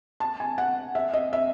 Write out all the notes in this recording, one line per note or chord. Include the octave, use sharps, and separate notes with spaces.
A5
G#5
F#5
E5
D#5
E5